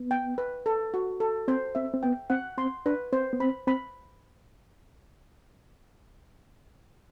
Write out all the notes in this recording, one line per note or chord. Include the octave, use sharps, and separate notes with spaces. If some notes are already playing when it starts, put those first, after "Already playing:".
Already playing: B3
G5
B4
A4
F#4
A4
C4 C5
C4 E5
C4
B3 G5
C4 F#5
C4 C6
D4 B4
C4 C5
B3
C4 B5
C4 B5